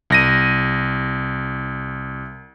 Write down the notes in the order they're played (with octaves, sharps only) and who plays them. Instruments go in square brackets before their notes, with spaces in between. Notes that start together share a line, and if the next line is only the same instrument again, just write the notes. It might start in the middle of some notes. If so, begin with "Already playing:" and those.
[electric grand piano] C2 A#6 D#7